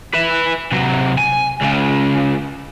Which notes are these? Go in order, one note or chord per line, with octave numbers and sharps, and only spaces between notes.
B4 E5
C3 F#3
G#5
C#2 C#3